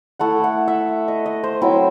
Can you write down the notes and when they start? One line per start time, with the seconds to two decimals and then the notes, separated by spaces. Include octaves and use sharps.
0.19 A3 E4 F#5
0.44 F#5
0.68 E5
1.08 D#5
1.26 D#5
1.43 C5
1.62 F#3 C4 E4